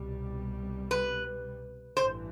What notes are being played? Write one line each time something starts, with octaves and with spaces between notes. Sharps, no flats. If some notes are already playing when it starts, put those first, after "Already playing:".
Already playing: C2 B2 G3
B4
A1 G2 E3 C5